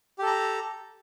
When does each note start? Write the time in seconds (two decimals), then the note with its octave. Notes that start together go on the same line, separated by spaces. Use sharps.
0.19 G4
0.22 A4
0.26 A#5